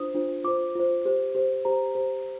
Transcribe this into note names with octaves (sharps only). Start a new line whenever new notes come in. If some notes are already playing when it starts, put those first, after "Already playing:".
Already playing: D4 F4 C5 D#6
D4 F4 C5
F4 C5 D6
F4 C5
G4 C5
G4 C5
G4 C5 A#5
G4 C5